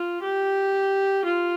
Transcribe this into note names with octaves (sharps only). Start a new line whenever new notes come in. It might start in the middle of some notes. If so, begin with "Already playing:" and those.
Already playing: F4
G4
F4